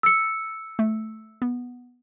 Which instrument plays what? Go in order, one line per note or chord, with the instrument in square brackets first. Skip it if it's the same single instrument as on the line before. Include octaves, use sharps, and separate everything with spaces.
[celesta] E6 C#7
[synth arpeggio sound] A3
B3